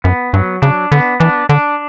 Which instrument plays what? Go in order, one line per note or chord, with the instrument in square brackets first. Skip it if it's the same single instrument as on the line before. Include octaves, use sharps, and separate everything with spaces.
[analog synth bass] F#2 [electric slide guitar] B3
[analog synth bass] G2 [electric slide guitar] F#3
[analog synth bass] C#3 [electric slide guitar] D4
[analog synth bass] D3 [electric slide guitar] B3
[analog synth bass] E3 [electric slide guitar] D4
[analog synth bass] D3 [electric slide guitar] D4